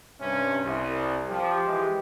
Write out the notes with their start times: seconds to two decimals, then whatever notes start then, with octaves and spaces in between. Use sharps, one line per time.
0.20 G2 C3 C#4
0.62 C2
1.30 F3 G4
1.65 E3 G#3